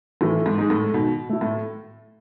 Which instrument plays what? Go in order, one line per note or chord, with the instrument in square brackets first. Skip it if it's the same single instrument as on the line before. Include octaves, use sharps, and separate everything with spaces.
[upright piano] A2 [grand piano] E3
[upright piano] G#2
[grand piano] G#3 D#4
[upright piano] A2
[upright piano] B2 [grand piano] D#3
[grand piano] A3 E4
[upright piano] A2